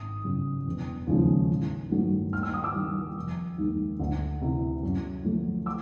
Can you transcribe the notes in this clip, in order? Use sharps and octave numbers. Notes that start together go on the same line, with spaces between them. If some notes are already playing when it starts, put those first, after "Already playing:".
Already playing: G#1 D#6
F#2 C#3
E1
D#2 C#3 F3 G#3
A1
G2 D#3 F#3 A3
D#2 F6
E6
D#6
D6 E6
D#3 G3
F1
D#2 D#3 G#3
D2
C3 E3
F#2
D3 F3 A3
D6 E6